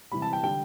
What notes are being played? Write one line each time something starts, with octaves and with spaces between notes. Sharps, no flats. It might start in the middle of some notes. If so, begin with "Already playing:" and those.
C3 E3 G3 B5
A5
G5
D3 G3 G5